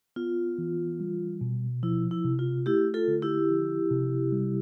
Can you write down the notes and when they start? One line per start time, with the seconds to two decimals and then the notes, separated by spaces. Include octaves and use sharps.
0.16 B3 F4
0.58 E3
1.00 G3
1.41 B2
1.83 F3 E4
2.11 E4
2.25 C3
2.39 F4
2.66 A3 E4 G4
2.94 F4 A4
3.08 D3
3.22 E4 G4
3.50 F3
3.91 C3
4.32 G3